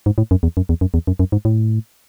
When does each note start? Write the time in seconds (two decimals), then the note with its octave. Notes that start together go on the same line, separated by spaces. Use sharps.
0.06 G#2
0.18 A2
0.31 F#2
0.43 E2
0.57 F#2
0.69 E2
0.81 F#2
0.94 E2
1.07 F#2
1.19 F#2
1.32 G#2
1.45 A2